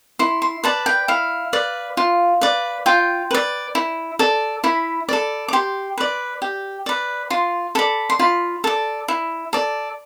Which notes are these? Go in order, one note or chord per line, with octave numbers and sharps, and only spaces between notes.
E4 C6
C6
B4 D5 A5
G5
E4 F5
B4 D5
F4
B4 D5
F4 G5
B4 D5
E4
A4 D5
E4 B5
A4 D5
D6
G4 C6
B4 D5
G4
B4 D5
F4 C6
A4 D5 B5
C6
F4 B5
A4 D5
E4
A4 D5